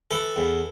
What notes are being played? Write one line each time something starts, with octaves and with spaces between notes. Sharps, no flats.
E3 A4
E2